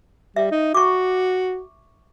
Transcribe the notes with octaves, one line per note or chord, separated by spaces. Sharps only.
G3 E5
D#4
F#4 C#6 D6